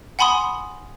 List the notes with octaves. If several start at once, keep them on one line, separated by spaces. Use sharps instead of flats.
F#5 G#5 B5 C6 D#6